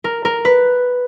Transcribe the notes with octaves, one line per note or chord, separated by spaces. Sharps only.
A#4
A#4
B4